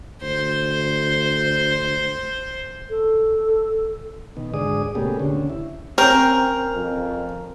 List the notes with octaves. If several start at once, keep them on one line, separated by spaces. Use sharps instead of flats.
D2 C5
A4
B2 D#3
D2 G#2 G#4 D5 D#6
A#2 C#3 A3 B3 G4 G#4
D2 D3 C#4
E4
C4 C#4 A#4 C5 G5
F2